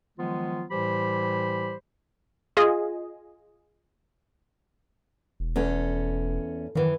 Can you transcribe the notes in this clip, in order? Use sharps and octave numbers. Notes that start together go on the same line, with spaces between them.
D#3 F3 F#3 G#3 B3 F4
A2 E3 G3 G4 C5 B5
F4 G#4 D#5
E1
E2 C#4 A4
F#2 D#3 E3